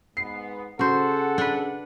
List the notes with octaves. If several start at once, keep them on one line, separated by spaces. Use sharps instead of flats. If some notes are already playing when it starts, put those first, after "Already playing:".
G#2 B3 C7
C#3 F#4 G#4 A4 C5 F#5
D4 B4